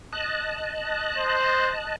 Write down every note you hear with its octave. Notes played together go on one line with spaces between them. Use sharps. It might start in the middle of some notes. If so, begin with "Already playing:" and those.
D#5 A5 F#6
C5